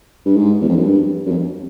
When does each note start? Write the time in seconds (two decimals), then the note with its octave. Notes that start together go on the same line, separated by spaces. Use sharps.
0.26 G2
0.37 G#2
0.61 E2
0.69 F2
0.76 F#2
0.84 G2
1.26 F#2
1.31 F2